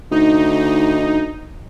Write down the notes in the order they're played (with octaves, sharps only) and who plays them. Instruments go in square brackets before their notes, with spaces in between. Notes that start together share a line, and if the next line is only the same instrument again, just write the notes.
[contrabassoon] D2 [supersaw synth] D#4